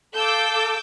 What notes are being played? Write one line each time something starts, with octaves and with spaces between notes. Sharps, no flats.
A4 F5 D6 E6 G6